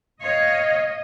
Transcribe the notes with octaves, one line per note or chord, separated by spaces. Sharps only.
C#5 D#5 F5